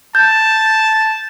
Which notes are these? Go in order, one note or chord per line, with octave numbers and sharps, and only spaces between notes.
A5 G6